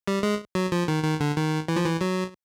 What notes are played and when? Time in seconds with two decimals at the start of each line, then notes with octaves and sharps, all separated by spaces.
0.07 G3
0.23 G#3
0.55 F#3
0.72 F3
0.88 D#3
1.03 D#3
1.20 D3
1.36 D#3
1.68 E3
1.76 F3
1.85 E3
2.01 F#3